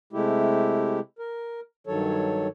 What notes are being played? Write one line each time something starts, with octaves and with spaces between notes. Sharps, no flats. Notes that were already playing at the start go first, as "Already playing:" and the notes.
C3 G#3 A3 E4 G4
A#4
G2 D#3 F#3 A4 C#5